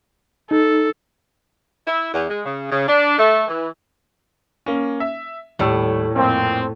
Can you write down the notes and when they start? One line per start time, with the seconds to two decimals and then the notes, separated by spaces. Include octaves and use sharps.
0.51 D#4 A4
1.87 E4
2.13 E2
2.28 G#3
2.45 C#3
2.71 C#3
2.87 D4
3.18 A3
3.48 E3
4.66 A#3 C#4
5.00 E5
5.59 D#1 A2 G3 E6
6.16 F2 A#2 A#3 C4